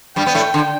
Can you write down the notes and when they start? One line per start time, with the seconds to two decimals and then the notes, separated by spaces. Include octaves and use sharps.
0.16 G2 G3 G5
0.26 B3
0.34 A2 A3
0.54 D3